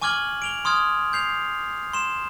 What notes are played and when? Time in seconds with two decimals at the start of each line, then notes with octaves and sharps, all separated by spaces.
0.02 G#5 C#6 D6 F6 G#6 F#7
0.42 D7 F7 G7
0.65 C6 D#6 F6 G#6
1.13 G6 C7 F7
1.93 C6 E7